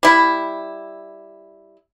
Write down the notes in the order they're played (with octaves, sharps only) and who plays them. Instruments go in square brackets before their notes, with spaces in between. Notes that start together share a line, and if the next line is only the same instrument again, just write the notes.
[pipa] G3 E4